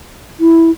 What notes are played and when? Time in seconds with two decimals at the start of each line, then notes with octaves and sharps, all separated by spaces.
0.40 E4